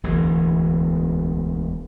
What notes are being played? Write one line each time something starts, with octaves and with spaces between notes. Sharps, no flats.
E1 D2 E3